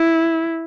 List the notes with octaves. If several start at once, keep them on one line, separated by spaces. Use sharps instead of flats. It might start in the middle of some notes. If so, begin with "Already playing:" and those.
Already playing: E4